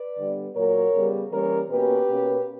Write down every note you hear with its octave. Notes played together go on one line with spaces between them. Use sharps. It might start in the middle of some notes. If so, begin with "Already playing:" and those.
Already playing: B4 D5
D3 G3 B3
A#2 F#3 A#3 A#4 C#5
C#3 G3 B3
E3 G3 A#3 C#4 A#4 C#5
B2 A#3 C#4 G4 B4
B2 A#3 C#4